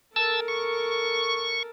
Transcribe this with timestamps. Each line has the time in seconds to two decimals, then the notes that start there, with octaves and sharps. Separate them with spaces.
0.16 A4 A#4 A5 E6
0.48 C#6